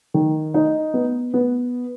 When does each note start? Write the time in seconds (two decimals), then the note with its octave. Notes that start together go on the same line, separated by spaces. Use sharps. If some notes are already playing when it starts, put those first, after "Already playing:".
0.14 D#3
0.54 D#4
0.94 B3
1.34 B3